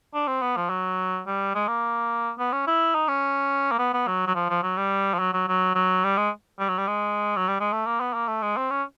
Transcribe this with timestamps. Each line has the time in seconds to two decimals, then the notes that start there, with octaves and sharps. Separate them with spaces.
0.14 D4
0.28 C4
0.41 B3
0.57 F3
0.70 F#3
1.27 G3
1.55 G#3
1.68 A#3
2.39 B3
2.52 C#4
2.67 E4
2.95 D#4
3.08 C#4
3.72 A#3
3.79 B3
3.94 B3
4.07 F#3
4.27 F#3
4.35 F3
4.49 F3
4.63 F#3
4.78 G3
5.14 F3
5.19 F#3
5.34 F#3
5.48 F#3
5.75 F#3
6.04 G3
6.17 G#3
6.59 G3
6.69 F#3
6.78 G3
6.87 G#3
7.37 F#3
7.48 G3
7.60 G#3
7.72 A3
7.86 A#3
8.00 B3
8.14 A#3
8.28 A3
8.42 G#3
8.57 C4
8.70 C#4